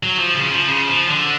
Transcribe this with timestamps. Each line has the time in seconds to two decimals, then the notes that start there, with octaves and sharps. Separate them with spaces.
0.03 F#3
0.19 F3
0.35 C#3
0.51 F3
0.68 C#3
0.88 F3
1.09 D3